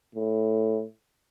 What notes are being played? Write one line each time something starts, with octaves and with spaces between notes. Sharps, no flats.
A2